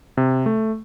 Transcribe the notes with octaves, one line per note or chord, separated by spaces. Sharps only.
C3
A3